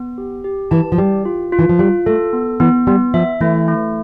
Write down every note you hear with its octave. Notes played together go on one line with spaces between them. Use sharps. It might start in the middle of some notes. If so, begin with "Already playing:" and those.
Already playing: B3
G4
G4
E3 A5
F3
G3 G4
F4
F4
E3
F3
G3 F4
A3 A4
B3
E3 B3
G3 B3
F3 E5
E3 A3
A3